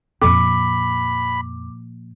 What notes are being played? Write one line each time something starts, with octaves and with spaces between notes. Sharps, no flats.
F2 A#2 F3 B5 D6